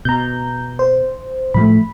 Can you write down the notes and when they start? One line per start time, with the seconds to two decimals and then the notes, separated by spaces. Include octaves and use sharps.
0.05 B2 A#5 G6
0.79 C5
1.54 A2 F3 A3 B5